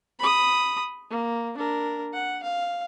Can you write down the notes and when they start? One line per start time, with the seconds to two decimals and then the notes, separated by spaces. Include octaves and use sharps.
0.19 B5 D#6
1.10 A#3
1.57 D4 A#4
2.13 F#5
2.43 F5